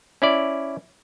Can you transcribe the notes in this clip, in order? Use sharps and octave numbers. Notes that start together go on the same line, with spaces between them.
C#4 E4 D5